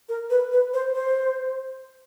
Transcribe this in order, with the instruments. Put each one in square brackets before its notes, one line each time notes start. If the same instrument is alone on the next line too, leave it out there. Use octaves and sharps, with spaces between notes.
[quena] A#4
B4
B4
C5
C5